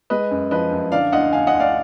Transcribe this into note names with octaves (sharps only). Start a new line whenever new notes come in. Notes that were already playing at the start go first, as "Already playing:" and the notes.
G#3 B4 D#5
F#2
F3 B4 D#5
F#2
D3 D5 F5
D2 D#5 F#5
D2 F5 G#5
D#5 F#5
D2
D5 F5